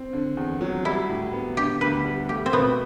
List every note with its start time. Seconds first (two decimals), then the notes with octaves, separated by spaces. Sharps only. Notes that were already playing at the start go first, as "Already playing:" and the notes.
Already playing: C4
0.13 D3
0.37 E2
0.61 F#3
0.85 G3 E4
1.09 A2
1.33 B3
1.57 D3 G4
1.81 D2 B4
2.05 G3
2.29 A3 G4
2.46 C4
2.53 B2 B3